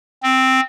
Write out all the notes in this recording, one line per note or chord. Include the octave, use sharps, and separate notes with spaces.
C4